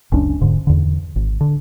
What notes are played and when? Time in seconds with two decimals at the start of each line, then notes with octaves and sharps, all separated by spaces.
0.12 F#1 C#2 C#4 D4
0.41 E1 G#2 D3
0.67 E2 D3
1.16 G#1
1.41 D3